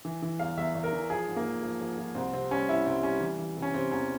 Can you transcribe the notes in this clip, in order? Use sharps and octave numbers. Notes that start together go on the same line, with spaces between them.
E3
E3
E2 F5
E2 E5
E2
A#4
E3
F3 G#4
G#2
A#3
F3
F3
F3
F3
C2 C4
C3 C4
G3 C#4
G3 E4
C2 C4
G3 C#4
E3
E3
C3
C#4
C3 C4
E2 C#4